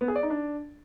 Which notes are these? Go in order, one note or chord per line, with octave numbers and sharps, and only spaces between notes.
B3
G#4
D5
D#4
D4